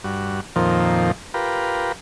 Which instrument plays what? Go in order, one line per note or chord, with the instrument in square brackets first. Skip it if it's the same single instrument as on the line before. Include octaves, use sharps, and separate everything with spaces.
[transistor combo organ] G2 F#4
F2 A#2 D#3 F3 C4
F4 G4 A#4 B4